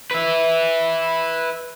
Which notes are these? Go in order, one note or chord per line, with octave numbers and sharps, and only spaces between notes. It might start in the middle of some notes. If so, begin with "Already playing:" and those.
B4 E5